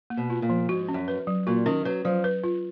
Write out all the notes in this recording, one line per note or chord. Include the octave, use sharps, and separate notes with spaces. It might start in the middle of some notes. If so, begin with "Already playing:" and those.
A#3
B2
F4
A#2
F3
G#2 F#4
C#4
F#2
B4
F#3
A#2 F#4
D#3 C#4
F#3 B4
F3 F#3
B4
F4